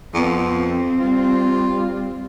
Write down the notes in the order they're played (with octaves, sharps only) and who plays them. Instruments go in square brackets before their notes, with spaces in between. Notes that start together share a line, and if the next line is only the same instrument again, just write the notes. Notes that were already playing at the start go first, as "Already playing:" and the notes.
[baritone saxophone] F2 [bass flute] B3 [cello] C4
[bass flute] G3 [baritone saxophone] F4